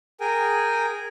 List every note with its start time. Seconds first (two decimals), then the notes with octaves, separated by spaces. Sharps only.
0.20 G#4 A#4 G5 G#5